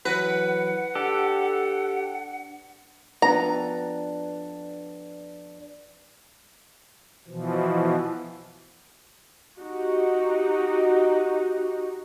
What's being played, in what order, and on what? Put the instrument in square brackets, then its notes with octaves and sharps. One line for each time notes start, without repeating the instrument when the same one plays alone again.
[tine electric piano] E3 F#3 A#6 [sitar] B4 [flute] F#5
[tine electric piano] D4 [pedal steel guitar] G4 A4
[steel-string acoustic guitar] F2 B3 D4 [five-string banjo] A#5
[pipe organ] B2 E3 F3
[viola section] D#4 F#4 G4